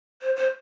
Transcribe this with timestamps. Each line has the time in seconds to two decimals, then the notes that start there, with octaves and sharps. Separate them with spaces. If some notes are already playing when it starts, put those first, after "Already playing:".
0.22 C5
0.36 C5